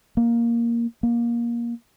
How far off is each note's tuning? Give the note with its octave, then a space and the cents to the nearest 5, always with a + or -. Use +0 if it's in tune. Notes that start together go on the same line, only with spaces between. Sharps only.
A#3 +5
A#3 +20